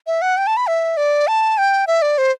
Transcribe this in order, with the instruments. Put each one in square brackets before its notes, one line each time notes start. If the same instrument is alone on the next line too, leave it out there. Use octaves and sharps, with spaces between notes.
[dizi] E5
F#5
G5
A5
B5
E5
D5
A5
G5
E5
D5
C5